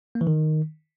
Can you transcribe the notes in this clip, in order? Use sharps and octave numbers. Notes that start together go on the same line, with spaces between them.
A#3
E3
D#3